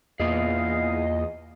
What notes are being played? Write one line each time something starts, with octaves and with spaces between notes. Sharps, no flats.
E2 A#3 F4 G#4 D#5 F5